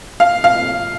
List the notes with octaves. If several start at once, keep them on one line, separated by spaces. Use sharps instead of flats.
F5
F5